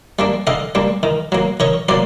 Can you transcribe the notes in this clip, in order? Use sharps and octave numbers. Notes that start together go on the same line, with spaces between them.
G3 A#3 D4
D3 D#5 F5
G3 A#3 D4
D#3
F#3 A#3
D#3 C#5 D#5
F#3 A#3 C5 D5